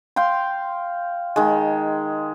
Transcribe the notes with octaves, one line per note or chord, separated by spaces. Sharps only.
F5 G5 C6
D#3 G#3